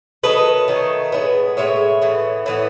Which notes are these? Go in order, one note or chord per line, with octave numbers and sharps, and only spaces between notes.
D#3 F#3 A3 B4 D#5
D#3 F#3 A3
A2 G#3 B3
A2 G#3 B3 C#5 E5
A2 E3 B3
A2 E3 B3